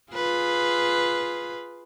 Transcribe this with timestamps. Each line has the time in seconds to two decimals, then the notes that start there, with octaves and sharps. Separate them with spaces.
0.12 F4 G#4 B4